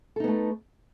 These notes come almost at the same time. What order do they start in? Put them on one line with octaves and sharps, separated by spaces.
A4 D#4 B3 A3